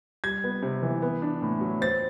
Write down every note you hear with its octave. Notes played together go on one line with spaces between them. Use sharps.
G3 G#6
B3
C3
E3
B3
D4
A2
F#3
C4 A6